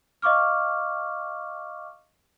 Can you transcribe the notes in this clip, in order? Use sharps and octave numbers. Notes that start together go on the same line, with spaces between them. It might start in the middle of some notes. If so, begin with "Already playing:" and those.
D#5 F5 C#6 D6 F6